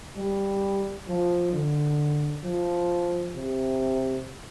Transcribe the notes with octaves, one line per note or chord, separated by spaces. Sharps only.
G3
F3
D3
F3
C3